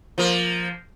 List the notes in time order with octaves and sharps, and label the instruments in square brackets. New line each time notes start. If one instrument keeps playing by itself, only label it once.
[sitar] F3 A#3